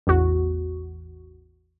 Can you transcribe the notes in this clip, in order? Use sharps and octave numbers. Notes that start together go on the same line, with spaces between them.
A1 E2 F#4